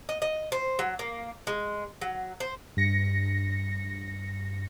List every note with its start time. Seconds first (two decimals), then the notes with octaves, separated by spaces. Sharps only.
0.09 D#5
0.22 D#5
0.52 C5
0.79 F#3
0.99 A#3
1.47 G#3
2.01 F#3
2.40 C5
2.77 G2 A#6 C#7